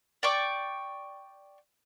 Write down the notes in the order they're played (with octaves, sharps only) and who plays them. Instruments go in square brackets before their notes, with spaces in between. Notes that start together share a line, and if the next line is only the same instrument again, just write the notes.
[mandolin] D5 G5 C#6 D6